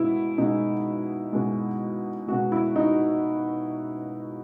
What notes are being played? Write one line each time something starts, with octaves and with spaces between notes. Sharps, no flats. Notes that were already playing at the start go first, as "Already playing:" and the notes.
Already playing: B2 G#3 E4
B2 G#3 D#4
B2 G#3
B2 G#3 F#4
E4
D#4